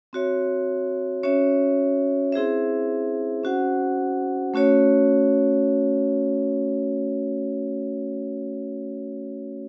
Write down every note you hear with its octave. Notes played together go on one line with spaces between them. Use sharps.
C4 F#4 C#5 E5
C#4 F#4 C#5 E5
C4 E4 G#4 C5 E5
C#4 F#4 C5 F#5
A3 C#4 F#4 C#5